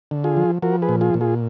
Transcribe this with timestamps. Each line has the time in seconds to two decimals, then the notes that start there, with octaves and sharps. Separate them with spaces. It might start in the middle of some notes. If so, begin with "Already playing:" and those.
0.11 D3
0.24 F4 G#4
0.37 F3
0.62 F3 F#4 A#4
0.82 G#4 B4
0.89 A#2
1.01 F4 G#4
1.14 A#2
1.21 F4 G#4